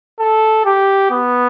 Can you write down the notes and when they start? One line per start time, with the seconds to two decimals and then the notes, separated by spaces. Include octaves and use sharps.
0.19 A4
0.66 G4
1.11 B3